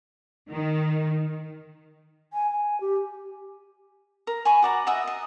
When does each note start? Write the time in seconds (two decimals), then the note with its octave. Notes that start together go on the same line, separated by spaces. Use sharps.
0.51 D#3
2.33 G#5
2.51 G#5
2.81 G4
4.27 A#4
4.45 G#5 B5 C#6
4.62 F#4 D5 A#5
4.87 F#4 D#5 E5 F#5
5.07 D#5